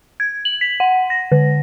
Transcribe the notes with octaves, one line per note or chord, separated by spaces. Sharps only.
G#6
F#7
B6
F#5
A#6
D3